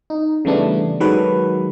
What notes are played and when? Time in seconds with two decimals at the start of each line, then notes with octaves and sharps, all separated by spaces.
0.10 D#4
0.45 C#3 E3 G3 A3 B3 D4
1.00 D#3 F#3 G#3 F#4 A4 B4